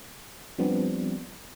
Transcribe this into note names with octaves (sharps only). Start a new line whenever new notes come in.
F3 G3 B3 C4 D4